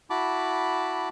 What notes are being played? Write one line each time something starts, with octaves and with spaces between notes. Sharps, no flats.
E4 F#4 A5 B5 D6